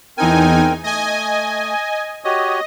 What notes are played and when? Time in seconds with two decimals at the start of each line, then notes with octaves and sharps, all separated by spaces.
0.18 E2 C4 D#4 A#4 G5 G#5
0.84 A3 D#5 G#5
2.24 F#4 G4 C#5 D#5